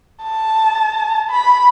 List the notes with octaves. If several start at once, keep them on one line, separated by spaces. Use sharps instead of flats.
A5
B5